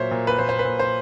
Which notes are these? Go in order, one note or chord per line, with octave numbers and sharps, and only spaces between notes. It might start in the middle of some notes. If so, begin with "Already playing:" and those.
Already playing: A#2 F#3 C5 C#5 E5
A#2
B4
A#2 C5
C5
B4
A#2
C5